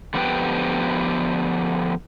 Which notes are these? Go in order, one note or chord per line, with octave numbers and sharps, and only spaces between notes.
D3 F3 B3 G4 B4 G5